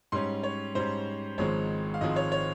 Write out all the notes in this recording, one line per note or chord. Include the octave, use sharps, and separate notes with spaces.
G#2 G3 C#4 C6
C#5
G#2 G3 C#4 C5
G#1 G#2 F3 G#3 C4 C#5
F5
G#1 G#2 F3 G#3 C4 D#5
C#5
C#5